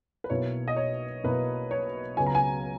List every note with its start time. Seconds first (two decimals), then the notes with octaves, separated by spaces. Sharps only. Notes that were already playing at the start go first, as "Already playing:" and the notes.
0.24 B4
0.30 B1 B2 A#3 E4 C#5
0.68 D#5
0.76 C#5
1.24 B1 B2 A#3 E4 B4
1.71 C#5
2.17 C#2 C#3 F#3 B3 G#5
2.27 A#5
2.35 G#5